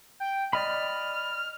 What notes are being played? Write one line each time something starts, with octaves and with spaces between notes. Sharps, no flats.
G5
D5 D#5 B5 F6